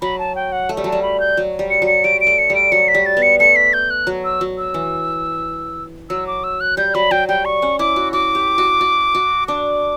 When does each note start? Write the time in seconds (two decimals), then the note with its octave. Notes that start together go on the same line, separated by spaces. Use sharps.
0.02 F#3 B5
0.19 A5
0.35 G5
0.52 F#5
0.69 A3
0.77 G3
0.84 F#3 A5
0.92 G3
1.02 B5
1.20 G6
1.37 F#3
1.59 G3
1.71 C#7
1.82 F#3
1.87 C#7
2.04 G3 D7
2.21 D7
2.27 A3
2.39 C#7
2.50 G3
2.55 D7
2.72 F#3 C#7
2.88 B6
2.94 G3
3.06 A6
3.17 B3
3.22 C#7
3.40 A3 C#7
3.56 B6
3.73 G6
3.90 F#6
4.07 F#3
4.25 E6
4.41 F#3
4.58 E6
4.74 E3
6.10 F#3 E6
6.27 D6
6.44 E6
6.61 F#6
6.77 G3 G6
6.95 F#3 B5
7.11 F#3 G5
7.28 G3 G5
7.45 C#6
7.62 C#4
7.79 E4 D6
7.96 F#4
8.13 F#4 D6
8.35 G4
8.58 F#4
8.81 F#4
9.15 F#4
9.48 D4 D6